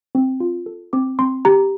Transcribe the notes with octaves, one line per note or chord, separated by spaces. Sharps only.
C4
F4
A4
C4 D6
C4 C6
G4 A#5